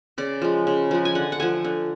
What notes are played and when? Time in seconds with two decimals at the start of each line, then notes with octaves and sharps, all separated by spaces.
0.18 C#3 D5
0.42 F3 G#3
0.67 C#3
0.91 F3 G#3
1.05 G#5
1.15 D3 F#5
1.32 F#5
1.40 F3 A3 G#5
1.65 D3